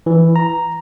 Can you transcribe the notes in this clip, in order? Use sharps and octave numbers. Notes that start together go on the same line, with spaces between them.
E3
A#5